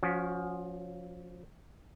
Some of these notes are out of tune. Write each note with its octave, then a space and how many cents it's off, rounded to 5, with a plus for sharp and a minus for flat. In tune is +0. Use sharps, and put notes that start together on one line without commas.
F3 +15 C#4 +20 F#4 -20